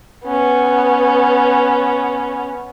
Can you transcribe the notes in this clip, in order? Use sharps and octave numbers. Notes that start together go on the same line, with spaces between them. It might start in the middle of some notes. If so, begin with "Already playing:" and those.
B3 C#4